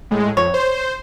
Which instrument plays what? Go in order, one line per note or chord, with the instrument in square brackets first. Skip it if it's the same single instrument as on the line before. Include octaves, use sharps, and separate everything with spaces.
[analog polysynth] A2 G#3
[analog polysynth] F2 [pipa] C#5
[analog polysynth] C5